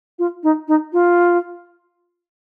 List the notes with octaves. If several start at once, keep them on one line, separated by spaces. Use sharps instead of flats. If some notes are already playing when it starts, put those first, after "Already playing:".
F4
D#4
D#4
F4